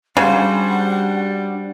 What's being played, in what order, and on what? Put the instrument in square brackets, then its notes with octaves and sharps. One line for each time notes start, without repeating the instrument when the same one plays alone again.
[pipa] C#3 [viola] G3 [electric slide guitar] D4 F#4 C5 [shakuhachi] F#5